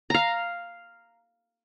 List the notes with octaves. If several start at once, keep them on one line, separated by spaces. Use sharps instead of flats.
F5 A#5